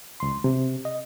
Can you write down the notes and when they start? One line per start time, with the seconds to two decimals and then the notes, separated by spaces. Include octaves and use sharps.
0.20 C#2 C6
0.44 C3
0.85 D#5